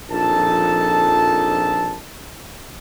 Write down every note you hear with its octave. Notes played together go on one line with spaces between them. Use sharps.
A#1 F2 D#4 A4 A5